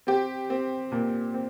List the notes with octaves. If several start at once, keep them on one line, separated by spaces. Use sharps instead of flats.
C4 G4
C4
A#2
C4